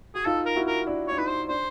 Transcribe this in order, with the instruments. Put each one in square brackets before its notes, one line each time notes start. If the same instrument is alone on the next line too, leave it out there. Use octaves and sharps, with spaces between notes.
[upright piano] F#4 [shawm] G#4
[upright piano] D#4 F4 [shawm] A4
[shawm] A#4
[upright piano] E4 F#4
[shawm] A#4
[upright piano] D4 E4
[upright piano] D4 [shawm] C#5
[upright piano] D#4 [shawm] B4
[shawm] C5
[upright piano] D4 [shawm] C5